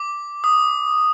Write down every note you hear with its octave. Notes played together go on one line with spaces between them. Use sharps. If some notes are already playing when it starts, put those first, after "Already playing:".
Already playing: D6
D#6